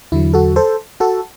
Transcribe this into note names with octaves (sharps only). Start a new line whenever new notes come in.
E2 D3 F#3 E4
F#4 A4
A4 C5
F#4 A4